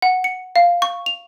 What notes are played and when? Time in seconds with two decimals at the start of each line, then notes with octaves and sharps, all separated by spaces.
0.02 F#5
0.24 C#7
0.56 F5
0.82 C#6
1.06 F7